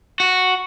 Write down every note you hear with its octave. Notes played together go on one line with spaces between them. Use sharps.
F#4